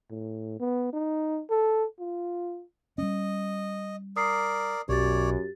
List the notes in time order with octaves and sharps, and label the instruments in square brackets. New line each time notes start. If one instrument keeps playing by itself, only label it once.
[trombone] A2
B3
D#4
A4
F4
[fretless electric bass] G3 G#3 C#4 [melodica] D#5
[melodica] A#4 D5 [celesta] D#6 C7
[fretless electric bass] B1 [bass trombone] F#2 [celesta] G4 A6 [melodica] C#5 D5